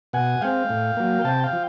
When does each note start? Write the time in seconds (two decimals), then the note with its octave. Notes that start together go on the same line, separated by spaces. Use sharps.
0.13 B2 F#5 G#5
0.41 G#3 C4 F5 G5
0.70 A2
0.97 F#3 A#3
1.24 C3 G5 A5
1.43 F5 G5
1.53 F3